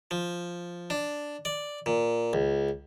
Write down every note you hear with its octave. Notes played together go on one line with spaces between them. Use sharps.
F3
D4
D5
A#2
C#2